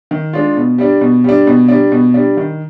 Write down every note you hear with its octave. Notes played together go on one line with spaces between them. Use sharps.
D#3
G#3 D4 F4
B2
G3 D4
B2
G3 D4
B2
G3 D4
B2
G3 D4
D#3